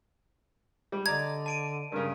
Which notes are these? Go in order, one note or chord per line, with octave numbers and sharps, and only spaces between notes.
G3
D3 D5 D#5 A#5 G#6
A5 D7 D#7
G2 C#3 A#4